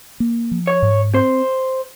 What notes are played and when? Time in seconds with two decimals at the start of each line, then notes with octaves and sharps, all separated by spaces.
0.20 A#3
0.51 F3
0.67 C#5
0.82 G#2
1.14 C4 C5